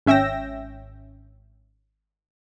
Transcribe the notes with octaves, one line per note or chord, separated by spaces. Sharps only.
G#1 C#4 E5 G5 E6 A#6